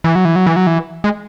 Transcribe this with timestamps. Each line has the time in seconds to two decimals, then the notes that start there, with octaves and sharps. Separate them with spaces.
0.04 E3
0.15 F#3
0.25 E3
0.36 F#3
0.46 E3
0.56 F#3
0.67 E3
1.04 G#3